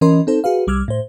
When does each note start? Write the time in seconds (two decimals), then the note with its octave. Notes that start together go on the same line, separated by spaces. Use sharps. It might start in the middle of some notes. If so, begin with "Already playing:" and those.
0.01 E3 C#4 A#4 D#5 C6
0.27 C4 D#4 A4 C5
0.44 F#4 G#4 B4 F5
0.67 C2 G3 D6 E6 F6 G#6
0.88 A2 C5